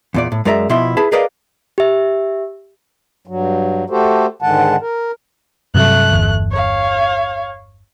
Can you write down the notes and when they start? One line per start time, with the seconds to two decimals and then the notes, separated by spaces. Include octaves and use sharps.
0.14 E2 A#2 D5
0.32 A2
0.45 F#2 G#3 A#4 D5 E5 A#5
0.69 B2 F3 E4 E5 C6
0.97 E4 G#4 B4 A5 B5
1.12 G#4 A#4 B4 D5 D#5 F5
1.78 G4 E5
3.27 G2 F#3
3.90 A3 F#4 G4 A4 C5
4.42 G#2 D3 D#3 G#3 F#5 A5
4.81 A#4
5.75 G2 C3 F#3 A3 F#6
6.11 G1 E2
6.52 C#5 F5